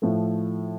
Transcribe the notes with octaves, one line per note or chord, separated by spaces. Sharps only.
A2 F3 A3